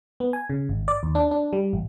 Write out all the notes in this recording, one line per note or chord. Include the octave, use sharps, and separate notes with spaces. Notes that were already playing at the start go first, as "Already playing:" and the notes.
B3
G#5
C#3
G#1
D5
D#2
D4
D4
G3
A1